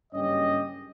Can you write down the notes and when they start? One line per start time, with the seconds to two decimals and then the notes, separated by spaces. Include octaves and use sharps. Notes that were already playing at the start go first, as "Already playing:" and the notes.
0.13 F#1 G2 C#4 G4 D#5